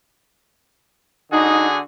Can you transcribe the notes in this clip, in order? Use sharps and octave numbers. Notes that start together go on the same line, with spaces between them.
D3 D#4 F#4 G#4